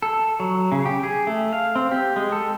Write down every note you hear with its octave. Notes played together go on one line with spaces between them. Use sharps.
A4
F#3
C#3
G4
G#4
A3
F5
C4
G4
G#3
A4